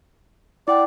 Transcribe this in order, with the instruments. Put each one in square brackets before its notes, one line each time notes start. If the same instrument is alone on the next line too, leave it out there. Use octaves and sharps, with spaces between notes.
[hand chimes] E4 F#5 G5 [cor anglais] D5